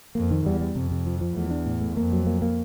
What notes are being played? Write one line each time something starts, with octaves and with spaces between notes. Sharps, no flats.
F2 A#3
D#3
E2 G3
G3
F2 C3
C3
F3
F3
E2 A3
D4
A2
A3
F2 A#3
F#3
A#3
A#3